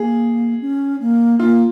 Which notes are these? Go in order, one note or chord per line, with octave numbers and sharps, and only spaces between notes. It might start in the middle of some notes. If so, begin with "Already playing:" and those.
Already playing: A#3 G#4
C#4
A#3
A#3 F4